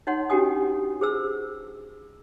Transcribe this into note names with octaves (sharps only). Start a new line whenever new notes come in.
D#4 C#5 F#5 C6
C#4 D4 F#4 G4 G#5 D#6
G#4 C5 E6